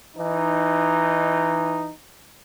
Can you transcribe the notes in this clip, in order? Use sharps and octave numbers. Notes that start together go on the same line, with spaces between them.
E3 D#4